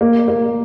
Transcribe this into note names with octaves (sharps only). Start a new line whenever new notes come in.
A#3
A#3